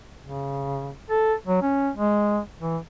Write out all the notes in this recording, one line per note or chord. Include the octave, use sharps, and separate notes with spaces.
C#3
A4
F#3
C#4
G#3
E3